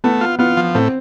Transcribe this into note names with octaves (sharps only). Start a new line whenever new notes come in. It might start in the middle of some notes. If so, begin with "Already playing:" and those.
A3 B3
F4
B3 F4
F3
A2 C4